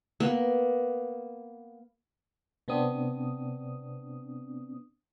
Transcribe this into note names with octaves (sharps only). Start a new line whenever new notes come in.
A#3 B3
C3 B3 C4 D4 D#6